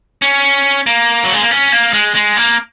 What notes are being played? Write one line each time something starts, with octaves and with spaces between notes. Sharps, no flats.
C#4
A#3
F#3
G#3
A#3
C#4
A#3
G#3
G#3
A#3